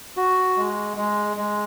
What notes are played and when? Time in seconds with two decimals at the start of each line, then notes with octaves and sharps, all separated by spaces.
0.17 F#4
0.57 G#3
0.97 G#3
1.37 G#3